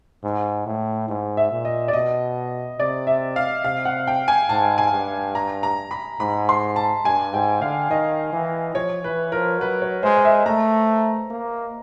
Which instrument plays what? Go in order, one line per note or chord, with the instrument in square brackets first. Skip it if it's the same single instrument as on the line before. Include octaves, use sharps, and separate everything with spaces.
[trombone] G#2
A2
G#2
[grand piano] E5
[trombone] A#2
[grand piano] D#5
D5
[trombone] B2 [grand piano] D#5
[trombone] C3 [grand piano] D5
[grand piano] E5
F5
[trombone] C3 [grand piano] F5
[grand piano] F#5
G5
G#5
[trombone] G#2 [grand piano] A5
[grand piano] G#5
[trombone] G2
[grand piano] A#5
A#5
B5
[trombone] G#2 [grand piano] B5
[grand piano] C6
A5
[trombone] G2 [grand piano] G#5
[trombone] G#2 [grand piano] G5
[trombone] D3 [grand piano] F5
[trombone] D#3 [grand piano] D#5
[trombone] E3
[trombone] F3 [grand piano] C#5
[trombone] E3 [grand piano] B4
[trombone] F3 [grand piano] A#4
[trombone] F#3 [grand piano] B4
[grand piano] C#5
[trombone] G#3 [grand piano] C5
[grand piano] D#5
E5
[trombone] A3 [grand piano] A#5
[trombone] A#3